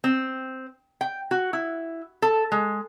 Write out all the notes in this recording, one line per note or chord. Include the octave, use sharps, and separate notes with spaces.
C4
G5
F#4
E4
A4
G#3